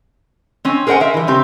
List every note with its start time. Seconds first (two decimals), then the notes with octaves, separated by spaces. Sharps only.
0.65 C4 C#4
0.87 G#4 A#4 C5 D#5 F#5 G#5
1.00 A#4 E5 F5
1.14 E3 G3
1.27 C#3 C4 G4